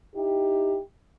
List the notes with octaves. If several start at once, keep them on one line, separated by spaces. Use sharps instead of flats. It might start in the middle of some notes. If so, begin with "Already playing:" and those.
D#4 E4 G4